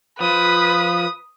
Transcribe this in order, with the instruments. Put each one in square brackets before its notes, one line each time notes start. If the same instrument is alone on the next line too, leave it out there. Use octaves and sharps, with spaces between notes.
[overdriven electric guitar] F3 [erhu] B4 [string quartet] D#6